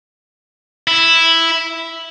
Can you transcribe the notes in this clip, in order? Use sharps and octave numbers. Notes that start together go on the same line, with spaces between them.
E4